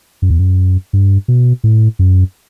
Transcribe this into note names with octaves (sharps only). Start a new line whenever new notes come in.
F#2
E2
F#2
G2
B2
A2
F#2